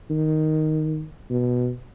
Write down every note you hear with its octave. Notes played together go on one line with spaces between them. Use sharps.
D#3
B2